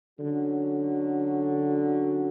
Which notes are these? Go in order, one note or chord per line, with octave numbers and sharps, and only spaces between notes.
D3 F#3 C#4 F#4